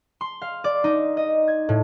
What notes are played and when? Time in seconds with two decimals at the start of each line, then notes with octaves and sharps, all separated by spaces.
0.21 C6
0.42 F5
0.64 D5
0.84 D#4
1.17 D#5
1.48 G#6
1.69 A2